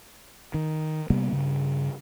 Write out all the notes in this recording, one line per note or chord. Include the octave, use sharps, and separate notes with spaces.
D#3
C3 G3 A#3 B3
G2 C#3